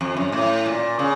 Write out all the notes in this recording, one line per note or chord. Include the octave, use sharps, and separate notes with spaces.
F2
F#2
A2
A#2
C#3